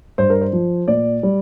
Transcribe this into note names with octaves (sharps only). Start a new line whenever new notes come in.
G2 C5
A#4
C5
F3
A#2 D5
G3